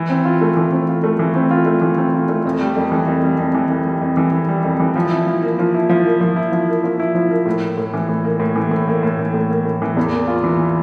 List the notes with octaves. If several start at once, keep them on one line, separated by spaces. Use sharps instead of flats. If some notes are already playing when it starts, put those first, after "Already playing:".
Already playing: E3
C4
F4
A3
E3
C4
F4
A3
E3
C4
F4
A3
E3
C4
F4
A3
F2
G3
F2
E3
F2
G3
F2
E3
F2
G3
F2
E3
F2
G3
F2
E3
F3
E4
F3
A#3
F3
E4
F3
A#3
F3
E4
F3
A#3
F3
E4
F3
A#3
A2
A#3
A2
E3
A2
A#3
A2
E3
A2
A#3
A2
E3
A2
A#3
A2
E3
E2
A#3
F4
E3